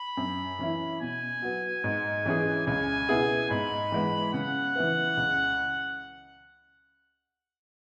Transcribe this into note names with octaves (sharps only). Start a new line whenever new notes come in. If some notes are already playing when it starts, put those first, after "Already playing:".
Already playing: B5
F#2
E3 C#4 E4
B2 G#5
F#3 B3
G#2
E3 C#4 G#4
C#2 G#5
B2 B3 E4 G#4
G#2 B5
E3 G#3 B3
C#3 F#5
E3 B3 E4 B4
C#2